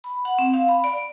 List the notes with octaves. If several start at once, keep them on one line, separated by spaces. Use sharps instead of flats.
B5
F#5
C4
F5
B5
D5